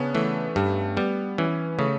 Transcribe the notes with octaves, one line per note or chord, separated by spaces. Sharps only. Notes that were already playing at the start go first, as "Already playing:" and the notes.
Already playing: C#3 B3 C#4 D4
E3 A3
G2 G3
G3 B3
E3 C#4
C#3 A3